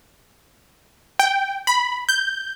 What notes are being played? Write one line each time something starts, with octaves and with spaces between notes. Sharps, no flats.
G5
B5
G6